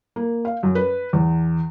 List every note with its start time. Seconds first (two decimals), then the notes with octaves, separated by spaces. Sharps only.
0.16 A#3
0.45 F5
0.63 F#2
0.75 B4
1.13 E2